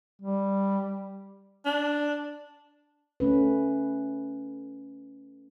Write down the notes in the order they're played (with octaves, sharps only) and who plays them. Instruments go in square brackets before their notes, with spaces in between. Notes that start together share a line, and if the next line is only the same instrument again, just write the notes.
[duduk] G3
[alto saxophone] D4
[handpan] A3 C#4 B4